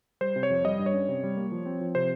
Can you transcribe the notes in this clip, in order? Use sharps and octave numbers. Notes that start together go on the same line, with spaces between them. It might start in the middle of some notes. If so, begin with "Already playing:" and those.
G3 C5
C3
C#5
F2
G3 D#5
G2
C#5
C#4
C3
G3
A#3
F3
C4
F3
C3 C5